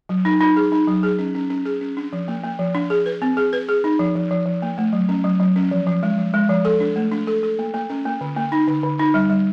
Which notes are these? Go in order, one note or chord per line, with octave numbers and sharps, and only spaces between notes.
F#3
D#4
D#4
G#4
D#4
F#3
G#4
C#4
C#4
C#4
G#4
C#4
D4
F3
A#3
A#3
F3
D4
G#4
B4
C4
G#4
B4
G#4
D#4
F3
F3
F3
F3
A#3
A3
F#3
C#4
F#3
F#3
C#4
F3
F3
G#3
F3
G#3
F3
A4
D4
A3
D4
A4
A4
A#3
A#3
C#4
A#3
D3
A#3
D#4
D3
D3
D#4
G3
G3